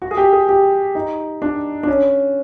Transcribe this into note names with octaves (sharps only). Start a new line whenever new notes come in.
F#4
G#4
G4
G#4
G4
D#4
D4
D4
C#4